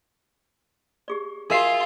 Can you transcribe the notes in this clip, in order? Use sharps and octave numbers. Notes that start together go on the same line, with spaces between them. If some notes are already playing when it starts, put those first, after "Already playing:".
G4 G#4 D5
F4 F#4 G#4 A#4 E5 C7